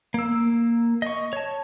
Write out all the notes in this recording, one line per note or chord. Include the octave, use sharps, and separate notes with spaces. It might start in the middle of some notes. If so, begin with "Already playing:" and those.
A#3 E6
D#5 C#6
C#5 A5